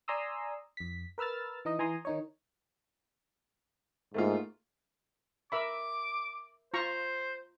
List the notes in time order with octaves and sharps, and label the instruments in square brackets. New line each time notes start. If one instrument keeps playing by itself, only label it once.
[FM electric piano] D5 G#5 A#5 C6 D#6 E6
F2 B6
A#4 B4 E6 F6 A6
E3 D#4 D#5
E3 G#5 A#5 C6 D#6
D#3 D#4 C#5
[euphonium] G#2 [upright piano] A3 A#3 F4
[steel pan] A#4 E5 B5 [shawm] D6
[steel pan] F4 A#5 C#6 [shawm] C5